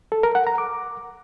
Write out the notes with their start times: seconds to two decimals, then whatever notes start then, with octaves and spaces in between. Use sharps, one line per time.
0.12 A4
0.23 A#4
0.35 F#5
0.47 A#5
0.58 D6